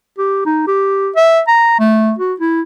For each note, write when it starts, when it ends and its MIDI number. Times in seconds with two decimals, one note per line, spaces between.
0.18 0.44 67
0.45 0.62 63
0.67 1.10 67
1.16 1.41 76
1.47 1.77 82
1.79 2.14 57
2.19 2.34 66
2.40 2.61 64